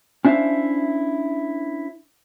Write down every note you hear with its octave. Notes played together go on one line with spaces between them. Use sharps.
C#4 D4 E4 C5 E5 F5